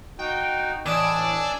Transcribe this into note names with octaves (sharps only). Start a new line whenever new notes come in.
D#4 F#4 G5
A2 E3 D4 D5 D#5 G#5 D6 E6